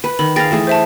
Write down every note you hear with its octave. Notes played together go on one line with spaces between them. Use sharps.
B4
D#3 B5
G#4 B4 F5 G5 A6 A#6
E3 A3 G#4
C5 E5 A5